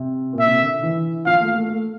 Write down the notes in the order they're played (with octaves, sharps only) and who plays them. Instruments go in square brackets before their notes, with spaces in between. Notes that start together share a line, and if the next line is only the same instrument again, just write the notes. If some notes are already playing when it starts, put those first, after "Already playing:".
Already playing: [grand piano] C3
A#2
[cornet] E5
[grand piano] C3
D3
E3
[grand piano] F3 [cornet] F5
[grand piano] A3
A3
A3